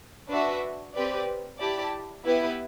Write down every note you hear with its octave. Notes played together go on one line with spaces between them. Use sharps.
D4 F#4 B4 E5
C4 G4 B4 D5
E4 G4 D5 A5
B3 E4 G4 B4